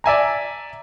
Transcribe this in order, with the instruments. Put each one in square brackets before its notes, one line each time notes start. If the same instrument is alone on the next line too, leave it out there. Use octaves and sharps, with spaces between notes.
[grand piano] D5 E5 G#5 A#5